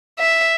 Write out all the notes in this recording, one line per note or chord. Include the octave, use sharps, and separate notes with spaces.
E5